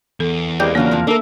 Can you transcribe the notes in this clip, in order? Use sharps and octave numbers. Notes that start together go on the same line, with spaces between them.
E2 A4
C2 E3 G#3 A#3 D5 G5 G6
A2 C#3 F#3 A#3 D4 F4 A#4
C3 F3
A#3 D4 A4 A#4 E5